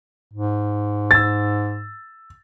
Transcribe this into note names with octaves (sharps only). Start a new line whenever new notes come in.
G#2
E6 A6